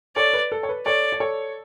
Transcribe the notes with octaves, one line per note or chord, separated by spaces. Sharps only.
A4 C#5 D5
B4
A4
C#5
B4
A4 C#5 D5
D5
A4 C#5